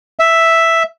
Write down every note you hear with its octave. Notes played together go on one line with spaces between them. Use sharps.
E5